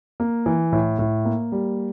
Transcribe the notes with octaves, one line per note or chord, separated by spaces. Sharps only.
A#3
E3
A2
A2
A#3
G3